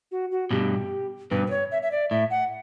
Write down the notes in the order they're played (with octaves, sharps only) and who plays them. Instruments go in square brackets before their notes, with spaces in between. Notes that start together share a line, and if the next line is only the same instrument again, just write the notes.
[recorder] F#4
F#4
[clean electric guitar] G2 B2 [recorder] G4
[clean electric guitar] G2 B2 [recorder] B4
[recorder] B4
C#5
E5
E5
D5
[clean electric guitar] A2 [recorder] E5
[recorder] F#5